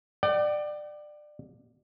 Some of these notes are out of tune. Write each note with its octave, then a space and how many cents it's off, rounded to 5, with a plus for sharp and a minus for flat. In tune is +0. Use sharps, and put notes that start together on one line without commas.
D5 +25 G5 -45